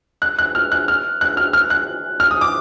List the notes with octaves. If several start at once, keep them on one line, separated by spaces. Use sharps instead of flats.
F#6
F#6
F6
F#6
F6
F#6
F6
F6
F#6
F6
D#6
D6